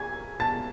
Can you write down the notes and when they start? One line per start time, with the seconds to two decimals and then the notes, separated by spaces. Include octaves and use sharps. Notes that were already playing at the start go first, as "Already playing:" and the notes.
Already playing: G#5 G#6
0.40 A5 A6